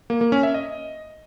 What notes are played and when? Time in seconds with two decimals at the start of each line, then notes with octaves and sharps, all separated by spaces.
0.10 A#3
0.21 A#3
0.32 C#4
0.43 E5
0.54 D#5